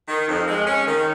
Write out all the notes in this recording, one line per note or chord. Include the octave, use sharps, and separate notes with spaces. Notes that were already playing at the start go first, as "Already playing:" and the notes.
D#3
F2
G#3
C#4
D#3